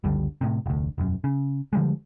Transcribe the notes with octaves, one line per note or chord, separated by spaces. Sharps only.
F#1 C#2 D3 G3
A2 C3
F1 D2
E1 F#2
C#3
D3 F3 G3 G#3